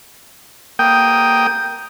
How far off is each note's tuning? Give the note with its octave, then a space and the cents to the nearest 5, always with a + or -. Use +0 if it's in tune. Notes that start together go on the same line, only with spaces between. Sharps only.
A#3 +0 G5 +0 D#6 +0